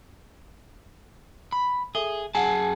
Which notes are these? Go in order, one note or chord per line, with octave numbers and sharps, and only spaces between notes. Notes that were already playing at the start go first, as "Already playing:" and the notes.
B5
G#4 A4 E5 G7
F#2 G#4 F#5 G#5 A5